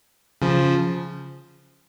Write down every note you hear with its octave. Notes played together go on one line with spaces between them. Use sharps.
C#3 F3